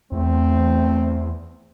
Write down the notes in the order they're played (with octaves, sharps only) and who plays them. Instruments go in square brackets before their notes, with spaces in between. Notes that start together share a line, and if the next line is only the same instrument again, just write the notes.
[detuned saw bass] E2 [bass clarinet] A3 [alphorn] C4